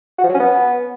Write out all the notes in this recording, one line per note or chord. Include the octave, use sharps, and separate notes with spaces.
F#4
F3
F#3
C#4
B3